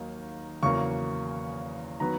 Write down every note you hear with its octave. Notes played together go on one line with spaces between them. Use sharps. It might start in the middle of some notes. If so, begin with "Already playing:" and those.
Already playing: D#2 D#3 F#3 A#3 D#4
E2 C#3 F#3 A#3 C#6
D#3 F#3 B3 A#5